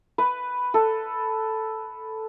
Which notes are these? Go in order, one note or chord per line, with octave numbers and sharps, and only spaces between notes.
B4
A4